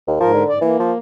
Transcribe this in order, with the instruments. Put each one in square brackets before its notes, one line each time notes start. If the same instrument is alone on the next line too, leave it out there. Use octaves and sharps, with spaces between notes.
[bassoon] D#2
[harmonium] G#2 A#4 [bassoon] F3
[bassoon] D3
[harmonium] G#2 D5
[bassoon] E3 [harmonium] A#3
[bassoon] F3